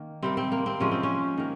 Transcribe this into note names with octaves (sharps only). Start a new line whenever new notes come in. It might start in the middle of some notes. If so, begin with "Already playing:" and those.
Already playing: D#3 A#3
C3 G3 A#3 C4
C4
A#3
C4
C3 F3 G#3 C#4
C4
C#4
D#3 A#3